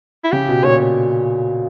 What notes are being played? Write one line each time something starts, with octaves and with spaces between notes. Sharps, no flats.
E4
C#3 G4
B2
A#2 C#5